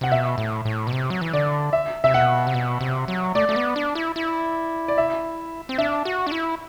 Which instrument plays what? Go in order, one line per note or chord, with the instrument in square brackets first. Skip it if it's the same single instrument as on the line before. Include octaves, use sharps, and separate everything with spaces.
[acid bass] C3 [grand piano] F#5
[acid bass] B2 [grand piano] E5
[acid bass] A2
A2
B2
C3
F#3
E3
[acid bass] D3 [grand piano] D5
[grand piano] E5
[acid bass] C3 [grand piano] E5
[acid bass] B2 [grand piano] F#5
[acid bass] C3
B2
C3
F#3
[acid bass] A3 [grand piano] D5
[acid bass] A3
B3
D4
E4
E4
[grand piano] D5
E5
[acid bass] C4
[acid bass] D4 [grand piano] E5
[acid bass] F#4
D4
E4